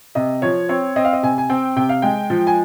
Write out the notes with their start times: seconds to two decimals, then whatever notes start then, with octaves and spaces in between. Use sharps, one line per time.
0.15 C3 D#5
0.42 F3 C#5
0.69 C4 C#5
0.96 C4 D#5
1.05 F5
1.13 D#5
1.23 C3 G#5
1.38 G#5
1.50 C4 G5
1.76 C3 G5
1.89 F5
2.02 G#3 G5
2.30 F3
2.47 G#5